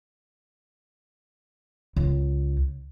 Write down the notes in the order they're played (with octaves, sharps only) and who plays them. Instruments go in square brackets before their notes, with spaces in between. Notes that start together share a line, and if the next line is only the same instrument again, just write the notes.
[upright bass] C#2